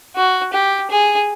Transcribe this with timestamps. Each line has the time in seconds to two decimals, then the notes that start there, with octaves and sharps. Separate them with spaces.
0.16 F#4
0.53 G4
0.91 G#4